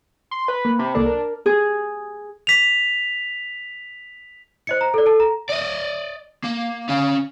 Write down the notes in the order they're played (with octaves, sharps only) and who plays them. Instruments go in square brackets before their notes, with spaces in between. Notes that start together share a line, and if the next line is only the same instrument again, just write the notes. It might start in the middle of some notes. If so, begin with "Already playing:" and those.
[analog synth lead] C6
B4
[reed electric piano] A#3
[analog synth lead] C3 [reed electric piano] B5
[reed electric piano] C2 A#3 A4 [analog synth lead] D4
[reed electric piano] A#4
[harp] G#4
[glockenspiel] B6 F7
[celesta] C5 D#5 C#7
A#5
A4 D5
A4 A5
A#5
[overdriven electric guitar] D5 D#5
A#3
C#4 F5